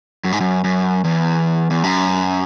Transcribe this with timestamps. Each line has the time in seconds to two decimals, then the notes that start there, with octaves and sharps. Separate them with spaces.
0.24 F#2
0.32 G#2
0.40 F#2
0.64 F#2
1.04 E2
1.71 E2
1.83 F#2